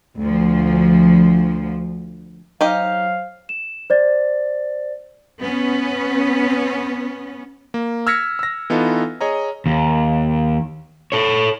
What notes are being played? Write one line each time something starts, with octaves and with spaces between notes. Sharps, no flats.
D2 F3
F#3 D#4 G4 C5 D#5 F5
E7
C5 D5 A6
B3 C#4
A#3
E6 F6 G#6 A#6 B6 C#7
E6 A#6
E3 B3 D#4 F4 A4
G#4 C#5 D#5 A#5
D#2
A4 C#5